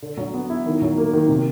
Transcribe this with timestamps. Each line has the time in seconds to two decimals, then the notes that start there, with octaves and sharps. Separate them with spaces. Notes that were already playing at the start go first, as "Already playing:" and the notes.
0.02 D3
0.17 F#3
0.34 B3
0.50 E4
0.66 D#3
0.82 F#3
0.98 A#3
1.13 D#3
1.28 C3